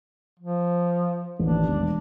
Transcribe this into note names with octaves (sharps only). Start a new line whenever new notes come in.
F3
A1 D#2 D4
E1